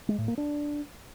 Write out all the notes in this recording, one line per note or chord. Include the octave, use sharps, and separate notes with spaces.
G#3
A2
A#3
D4